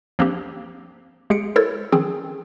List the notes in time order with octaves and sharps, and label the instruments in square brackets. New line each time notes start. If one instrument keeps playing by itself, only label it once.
[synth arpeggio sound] F3 A#3 C4 D4 G4
G#3 G4 G#4 C#7 D7
E4 A4 A#4 C5 C#5 A6
D#3 F3 C4 C#4 G#4